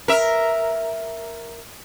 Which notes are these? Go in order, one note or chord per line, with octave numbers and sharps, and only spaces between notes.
A#4 E5